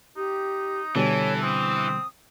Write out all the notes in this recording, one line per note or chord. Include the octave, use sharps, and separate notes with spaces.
D#4 G4
B2 D3 E3 G3 A4 C#5
C4 D#6